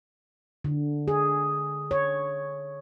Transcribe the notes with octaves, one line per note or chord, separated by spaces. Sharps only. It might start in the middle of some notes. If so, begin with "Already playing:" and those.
D3
G#4
C#5